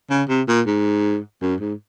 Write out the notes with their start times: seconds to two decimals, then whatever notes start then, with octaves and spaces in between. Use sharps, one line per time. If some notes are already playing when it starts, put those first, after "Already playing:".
0.10 C#3
0.29 C3
0.48 A#2
0.66 G#2
1.41 F#2
1.60 G#2